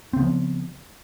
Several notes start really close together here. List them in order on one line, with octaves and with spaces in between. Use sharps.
C4 C#3 B3 F3